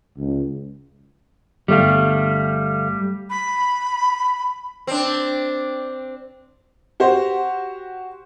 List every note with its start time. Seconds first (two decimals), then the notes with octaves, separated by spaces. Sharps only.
0.17 C#2
1.68 G1 G3 A3 F5
3.30 B5
4.87 C4 D4
7.00 F#4 G4 C5